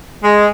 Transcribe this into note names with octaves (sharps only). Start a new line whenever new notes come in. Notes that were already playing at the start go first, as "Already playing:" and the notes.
G#3